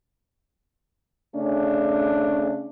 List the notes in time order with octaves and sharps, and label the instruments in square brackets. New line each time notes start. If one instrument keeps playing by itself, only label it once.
[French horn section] C#3 A3 C#4 D4